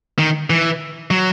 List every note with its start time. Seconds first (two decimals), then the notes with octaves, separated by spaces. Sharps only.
0.19 D#3
0.50 E3
1.11 F#3